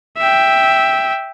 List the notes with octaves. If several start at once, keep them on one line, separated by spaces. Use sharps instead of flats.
E5 G5